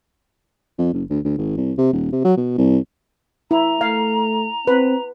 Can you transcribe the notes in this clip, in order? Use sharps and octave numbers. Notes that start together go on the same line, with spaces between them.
F2
F#1
D2
D2
G#1
C2
C3
D#1
C3
F#3
B2
C2
E4 A#5
A3 F5
C4 B4